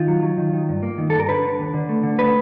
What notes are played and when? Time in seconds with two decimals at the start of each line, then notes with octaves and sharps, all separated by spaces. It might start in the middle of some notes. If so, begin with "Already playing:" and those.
Already playing: D#3 F4
0.08 F#3
0.22 F#3
0.38 D#3
0.53 D#3
0.69 G2
0.83 A#3
0.98 D#3
1.10 A4
1.14 G2
1.20 A#4
1.29 D3 B4
1.44 D3
1.59 D#2
1.74 D3
1.89 A3
2.03 D3
2.19 A3 B4